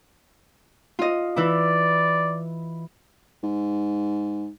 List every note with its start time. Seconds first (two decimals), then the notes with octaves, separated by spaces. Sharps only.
0.99 F4 D#5
1.36 E3 E4 D5
3.43 G#2